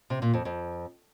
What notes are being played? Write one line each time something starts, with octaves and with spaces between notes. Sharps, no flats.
C3
A#2
F2
F2